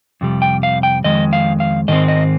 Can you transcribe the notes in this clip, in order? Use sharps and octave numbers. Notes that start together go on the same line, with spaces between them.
F2 C3 G3
G5
F5
G5
F2 D#3 G#3 D#5
F5
F5
G#2 D#3 G#3 C4 D#5
D#5